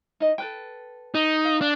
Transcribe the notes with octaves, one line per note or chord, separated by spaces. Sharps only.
D#4 D#5
A4 B4 G5
D#4
F5
D4